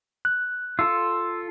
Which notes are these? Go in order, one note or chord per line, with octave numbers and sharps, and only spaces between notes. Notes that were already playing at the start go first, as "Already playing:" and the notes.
F#6
F4 A4 E6